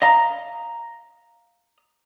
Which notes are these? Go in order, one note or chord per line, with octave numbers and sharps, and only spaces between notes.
D#5 F5 A#5